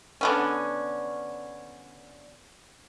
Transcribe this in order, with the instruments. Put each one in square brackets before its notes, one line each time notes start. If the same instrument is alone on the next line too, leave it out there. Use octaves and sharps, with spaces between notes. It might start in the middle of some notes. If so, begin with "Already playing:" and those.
[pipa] D3 B3 C#4